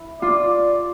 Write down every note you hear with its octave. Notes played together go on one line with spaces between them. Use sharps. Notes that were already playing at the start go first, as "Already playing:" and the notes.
Already playing: E4
F4 D5